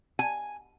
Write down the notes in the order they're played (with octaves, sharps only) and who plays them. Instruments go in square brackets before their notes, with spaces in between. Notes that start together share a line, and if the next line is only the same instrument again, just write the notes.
[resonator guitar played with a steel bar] G#5